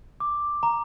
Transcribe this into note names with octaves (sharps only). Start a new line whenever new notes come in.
D6
A#5